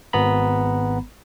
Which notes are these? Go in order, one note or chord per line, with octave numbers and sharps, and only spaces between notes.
G#1 B3 A#5 B5